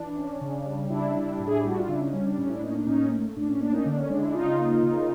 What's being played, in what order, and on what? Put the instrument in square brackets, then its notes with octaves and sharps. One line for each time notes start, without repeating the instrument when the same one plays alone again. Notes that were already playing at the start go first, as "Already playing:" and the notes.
Already playing: [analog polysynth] E3 D4
C#4
C#3
G3
C#3 D4 E4
G3
A2
G#4
G4
G3 F#4
F4
C#3 D4 E4
C#4 D#4
G3 C#4
D4
A2 C#4 D#4
D4 E4
A#3 C#4 D#4
D4
A2 C#4 D#4
A3
A2 D4
C#4
A#3 D4
C#4 D#4
D3 D4
C#4
G#3 D4
D4 E4
C#3 D#4 F4
A#3
C#3